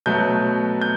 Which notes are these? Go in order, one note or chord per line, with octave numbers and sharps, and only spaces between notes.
B2 F#3 A3 G6
G6